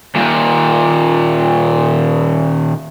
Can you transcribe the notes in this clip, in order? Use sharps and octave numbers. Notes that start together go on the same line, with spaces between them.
D#2 A#2